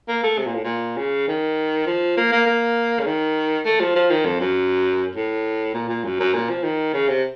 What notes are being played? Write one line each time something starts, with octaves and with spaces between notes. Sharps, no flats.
A#3
A3
C3
A#2
A2
A#2
C#3
D#3
F3
A#3
A#3
A#3
C#3
D#3
A3
F3
F3
D#3
F2
F#2
A2
A#2
A#2
F#2
F#2
A#2
F3
D#3
C#3
C3